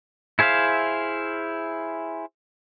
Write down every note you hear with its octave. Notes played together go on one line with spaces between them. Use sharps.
E4 G#4 C5 E5 F5